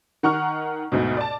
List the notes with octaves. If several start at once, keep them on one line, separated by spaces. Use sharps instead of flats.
D#3 F#5 A#5 C#6 F6
D2 G#2 B2
D5 A5